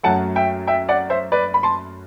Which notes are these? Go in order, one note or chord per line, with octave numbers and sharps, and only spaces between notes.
F#2 F#3 A3 F#5 A5
E5 G5
E5 G5
D5 F#5
C5 E5
B4 D5
B5
A5 C6